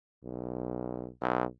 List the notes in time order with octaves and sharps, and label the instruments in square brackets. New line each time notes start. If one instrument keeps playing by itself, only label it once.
[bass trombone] B1
B1